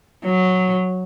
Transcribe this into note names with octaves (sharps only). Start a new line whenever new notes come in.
F#3